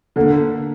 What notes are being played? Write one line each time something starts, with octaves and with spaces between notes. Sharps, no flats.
D3 A#3